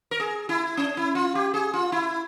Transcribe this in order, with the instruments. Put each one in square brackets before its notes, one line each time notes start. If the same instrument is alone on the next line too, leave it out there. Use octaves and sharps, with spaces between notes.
[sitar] A#4
G#4
E4
C#4
E4
F4
G4
G#4
F4
E4